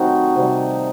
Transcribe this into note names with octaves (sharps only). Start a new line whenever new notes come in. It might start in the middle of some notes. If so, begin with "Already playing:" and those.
Already playing: C3 D#3 F#3 A3 C4 D#4 F#4
C3 G3